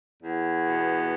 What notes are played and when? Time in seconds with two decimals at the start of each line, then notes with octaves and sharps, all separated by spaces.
0.21 E2
0.65 B2